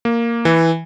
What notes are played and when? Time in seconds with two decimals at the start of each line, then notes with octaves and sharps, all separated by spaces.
0.05 A#3
0.45 E3